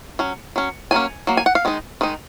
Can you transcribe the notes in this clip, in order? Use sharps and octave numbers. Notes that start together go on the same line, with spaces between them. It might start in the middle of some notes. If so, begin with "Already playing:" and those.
F#3 C#4
F#3 C#4
F#3 A#3 C#4 G#5
F#3 A#3
G#5
F#5
F5
D#3 G#3 D#4
D#3 G#3 D#4